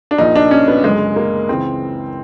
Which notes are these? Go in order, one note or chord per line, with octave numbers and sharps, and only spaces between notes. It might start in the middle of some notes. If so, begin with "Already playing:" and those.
D4
A#1 A#2 D#4
D4
C#4
B3
F#1 F#2 D3 G#3
A#3
C#2 C#3 E3 C4